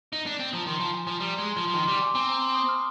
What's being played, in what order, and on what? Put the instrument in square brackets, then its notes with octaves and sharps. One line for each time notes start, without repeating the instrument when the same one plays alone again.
[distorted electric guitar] D#4
D4
C4
[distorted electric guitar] F3 [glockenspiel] A#5
[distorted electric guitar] D#3 [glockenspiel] C6
[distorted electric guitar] F3 [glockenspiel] A#5
[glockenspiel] G#5
[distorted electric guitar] F3 [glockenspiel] G#5
[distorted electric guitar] G3 [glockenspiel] A#5
[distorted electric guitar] G#3 [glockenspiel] A#5
[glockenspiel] C6
[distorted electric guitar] F3
[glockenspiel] C6
[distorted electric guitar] F3
[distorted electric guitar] D#3 [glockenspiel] C6
[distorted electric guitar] G3 [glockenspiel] D6
[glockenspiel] G#5
[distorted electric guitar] C4 [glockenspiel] G#5
[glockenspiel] A#5
C6
D#6
F6